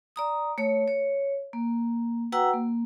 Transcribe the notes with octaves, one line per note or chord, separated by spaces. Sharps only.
D5 A#5 D#6
A3 C#5
C#5
A#3
F#4 B4 F#5 G5 A#5 E6
A#3